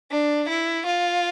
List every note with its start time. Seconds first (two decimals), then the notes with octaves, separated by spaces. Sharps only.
0.11 D4
0.48 E4
0.86 F4